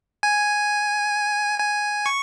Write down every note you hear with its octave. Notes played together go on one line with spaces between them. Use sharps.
G#5
G#5
C#6